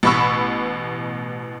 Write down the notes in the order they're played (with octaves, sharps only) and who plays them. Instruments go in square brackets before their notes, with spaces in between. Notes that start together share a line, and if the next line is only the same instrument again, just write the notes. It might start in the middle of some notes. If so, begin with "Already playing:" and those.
[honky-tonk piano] A1 B2 B5 C#6 E6